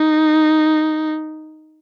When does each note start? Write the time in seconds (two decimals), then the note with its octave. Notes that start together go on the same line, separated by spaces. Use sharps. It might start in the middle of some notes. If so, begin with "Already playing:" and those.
Already playing: D#4